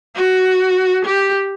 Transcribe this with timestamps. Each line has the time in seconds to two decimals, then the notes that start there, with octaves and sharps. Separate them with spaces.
0.16 F#4
1.06 G4